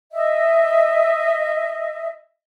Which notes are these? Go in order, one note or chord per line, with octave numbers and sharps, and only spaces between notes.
D#5 E5